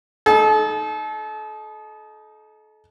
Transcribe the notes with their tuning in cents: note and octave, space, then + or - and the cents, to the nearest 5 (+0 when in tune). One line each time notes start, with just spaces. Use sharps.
D#4 +0 A4 -35